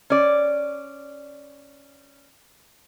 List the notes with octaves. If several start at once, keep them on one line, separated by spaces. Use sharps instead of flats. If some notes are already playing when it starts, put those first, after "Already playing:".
C#4 D5